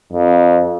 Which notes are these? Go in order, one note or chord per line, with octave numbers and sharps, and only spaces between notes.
F2